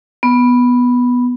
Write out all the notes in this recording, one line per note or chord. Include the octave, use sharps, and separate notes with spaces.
B3